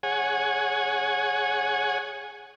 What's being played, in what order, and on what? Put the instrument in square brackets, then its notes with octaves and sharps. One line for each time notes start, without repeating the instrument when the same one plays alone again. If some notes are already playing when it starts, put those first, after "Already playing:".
[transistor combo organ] G#4 C#5 F#5 G#5